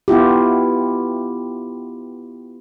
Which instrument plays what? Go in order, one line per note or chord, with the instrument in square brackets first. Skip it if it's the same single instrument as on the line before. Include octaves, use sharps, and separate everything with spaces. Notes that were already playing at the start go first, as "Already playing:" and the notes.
[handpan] B3 E4 F4 G4